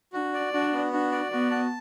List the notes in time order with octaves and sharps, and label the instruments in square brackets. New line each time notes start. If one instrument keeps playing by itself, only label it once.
[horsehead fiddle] D4 [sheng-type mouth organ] F#4
[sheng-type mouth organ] D5
[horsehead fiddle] D4 [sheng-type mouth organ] F#4
[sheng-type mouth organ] B3
[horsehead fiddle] D4 [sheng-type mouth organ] F#4
[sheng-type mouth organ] D5
[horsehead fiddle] B3 [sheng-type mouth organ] F#4
[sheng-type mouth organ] A5